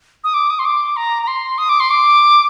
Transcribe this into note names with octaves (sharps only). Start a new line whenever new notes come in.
D#6
D6
D#6
C6
D6
A#5
A#5
C6
D#6
D6
C6
D6